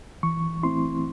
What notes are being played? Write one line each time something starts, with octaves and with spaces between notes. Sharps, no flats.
E3 C#6
A3 C4 E4 C6